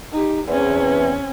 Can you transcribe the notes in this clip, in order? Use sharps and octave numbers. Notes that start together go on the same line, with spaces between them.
D#4 G4
E2 C4 C#4